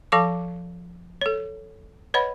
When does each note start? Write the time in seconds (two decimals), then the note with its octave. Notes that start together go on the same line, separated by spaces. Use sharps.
0.12 F3 A4 F5 A5 C#6 D6
1.21 A4 C#5
2.14 B4 C#5 D#5 F#5 B5